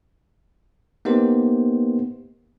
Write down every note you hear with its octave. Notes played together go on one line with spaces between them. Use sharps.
A#3 B3 D#4 G4 C5